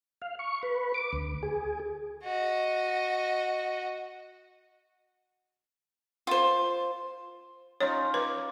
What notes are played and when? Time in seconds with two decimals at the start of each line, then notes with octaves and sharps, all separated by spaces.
0.22 F5
0.39 C#6
0.63 B4
0.94 D6
1.13 D2
1.43 G#4
2.23 F#4 D#5
6.27 F4 C5
7.81 C#4 D#4 F4 C#5
8.14 B4 D6